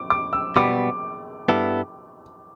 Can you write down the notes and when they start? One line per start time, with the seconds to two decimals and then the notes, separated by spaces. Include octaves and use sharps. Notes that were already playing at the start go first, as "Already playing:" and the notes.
Already playing: D6
0.10 D6
0.33 E6
0.56 B2 G3 B3 D6
1.49 G2 G3 B3 E4 A4